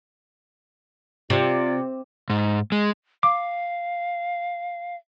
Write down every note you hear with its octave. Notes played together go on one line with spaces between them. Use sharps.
C3 F4 D5
G#2
G#3
F5 D6